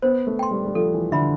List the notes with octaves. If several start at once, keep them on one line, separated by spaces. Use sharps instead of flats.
B3 C5
A3
G5 C6
G3
G3
F3 A4
E3
D3 E5 B5